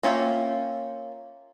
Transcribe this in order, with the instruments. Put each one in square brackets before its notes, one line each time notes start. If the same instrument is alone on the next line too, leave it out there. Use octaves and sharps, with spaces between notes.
[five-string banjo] A#3 C#4 F4 E5 G5